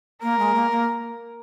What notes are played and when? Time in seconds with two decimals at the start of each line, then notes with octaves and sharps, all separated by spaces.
0.22 A#3 A#4
0.39 G#3
0.55 A#3
0.71 A#3